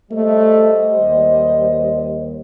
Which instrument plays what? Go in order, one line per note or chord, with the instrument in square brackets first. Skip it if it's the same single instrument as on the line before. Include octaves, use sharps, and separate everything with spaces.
[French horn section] G3 C5 D#5 [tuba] A3
[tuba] D#2